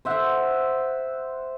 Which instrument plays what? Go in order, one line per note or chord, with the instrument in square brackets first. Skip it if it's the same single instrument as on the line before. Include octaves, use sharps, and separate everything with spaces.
[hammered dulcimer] C5 E5 F#5